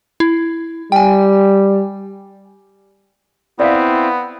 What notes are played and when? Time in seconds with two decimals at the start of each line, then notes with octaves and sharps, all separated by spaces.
0.20 E4
0.92 G3 G5 G#5
3.60 B3 C4 E4 D5 E5 F5